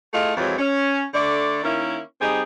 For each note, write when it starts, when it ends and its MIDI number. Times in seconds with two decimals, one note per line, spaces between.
0.14 0.32 57
0.14 0.32 64
0.14 0.32 65
0.14 0.32 68
0.14 0.32 75
0.37 0.54 41
0.37 0.54 52
0.37 0.54 54
0.37 0.54 56
0.37 0.54 65
0.59 1.04 61
1.13 1.60 50
1.13 1.60 57
1.13 1.60 74
1.64 1.99 51
1.64 1.99 58
1.64 1.99 61
1.64 1.99 64
2.20 2.42 55
2.20 2.42 60
2.20 2.42 63
2.20 2.42 68